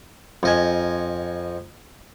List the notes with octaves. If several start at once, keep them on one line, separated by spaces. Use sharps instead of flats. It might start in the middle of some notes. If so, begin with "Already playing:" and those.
F2 D#5 G#5